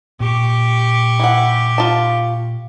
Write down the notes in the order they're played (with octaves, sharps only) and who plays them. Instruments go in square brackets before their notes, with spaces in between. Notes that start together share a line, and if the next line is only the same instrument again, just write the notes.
[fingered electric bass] A#2 [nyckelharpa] G4 C#6
[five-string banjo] E3 F#5
F4 A5